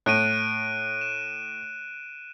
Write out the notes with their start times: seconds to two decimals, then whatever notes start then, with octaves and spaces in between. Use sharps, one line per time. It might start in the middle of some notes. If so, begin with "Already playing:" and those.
0.06 A2 F#6 D7 D#7
1.01 E7